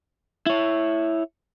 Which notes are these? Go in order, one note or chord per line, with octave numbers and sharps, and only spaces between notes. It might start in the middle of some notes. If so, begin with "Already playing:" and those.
E4 C#5